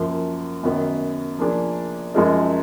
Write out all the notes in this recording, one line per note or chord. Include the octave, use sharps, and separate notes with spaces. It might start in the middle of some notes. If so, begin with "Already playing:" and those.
Already playing: F#2 F3 A#3
F#2 D#3 F#3 B3
F3 A#3 D4 G#4
F#2 F3 G#3 D#4 A#4